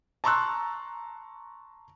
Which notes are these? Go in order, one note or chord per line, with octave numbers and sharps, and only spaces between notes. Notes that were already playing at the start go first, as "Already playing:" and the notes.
A5 A#5 C6 C#6 E6 F#6